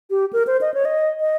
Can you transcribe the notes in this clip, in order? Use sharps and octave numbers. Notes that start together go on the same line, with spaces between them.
G4
A#4
C5
D#5
C#5
D#5
D#5